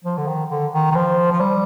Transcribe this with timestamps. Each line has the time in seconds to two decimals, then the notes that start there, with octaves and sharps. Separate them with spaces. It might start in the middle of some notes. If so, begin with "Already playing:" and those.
0.04 F3
0.18 D3
0.27 D#3
0.50 D3
0.73 D#3
0.91 D#3
0.95 F3
1.31 F3
1.40 G3